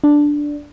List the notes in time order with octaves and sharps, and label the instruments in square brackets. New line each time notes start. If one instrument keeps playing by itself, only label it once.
[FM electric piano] D4